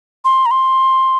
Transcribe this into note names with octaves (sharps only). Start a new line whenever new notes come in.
C6
A#5
C6